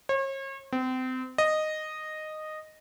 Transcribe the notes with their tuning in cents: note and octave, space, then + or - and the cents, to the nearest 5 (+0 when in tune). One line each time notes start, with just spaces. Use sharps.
C#5 -40
C4 -30
D#5 -10